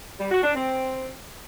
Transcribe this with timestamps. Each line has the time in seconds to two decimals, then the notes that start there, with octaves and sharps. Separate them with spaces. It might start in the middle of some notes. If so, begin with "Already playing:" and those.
0.20 G3
0.31 F#4
0.43 D4
0.55 C4